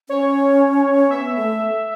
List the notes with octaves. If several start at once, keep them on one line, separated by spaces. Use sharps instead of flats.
C#4 C#5
B3 E5
A3